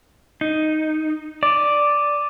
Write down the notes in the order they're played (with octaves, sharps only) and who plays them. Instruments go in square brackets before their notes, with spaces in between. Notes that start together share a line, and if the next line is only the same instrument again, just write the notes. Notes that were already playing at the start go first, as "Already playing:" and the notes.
[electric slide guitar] D#4
[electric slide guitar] D5 [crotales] D6 D#7